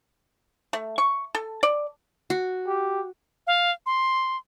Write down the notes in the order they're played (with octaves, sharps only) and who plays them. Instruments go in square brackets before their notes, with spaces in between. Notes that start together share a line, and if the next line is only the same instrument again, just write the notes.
[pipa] A3
C#6
A4
D5
[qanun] F#4
[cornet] G4
[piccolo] F5
C6